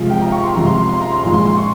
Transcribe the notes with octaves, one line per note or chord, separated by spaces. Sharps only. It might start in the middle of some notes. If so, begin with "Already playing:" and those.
Already playing: C3 F3 G#3
G5
A#5
C#6
C6
C3 F3 G#3 A#5
C6
C6
C6
A#5
C6
A#2 F3 G#3 C6
C6
C6
C#6